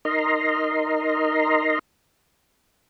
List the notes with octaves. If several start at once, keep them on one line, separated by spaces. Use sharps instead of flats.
D#4 A#4 D#5 A#5 C6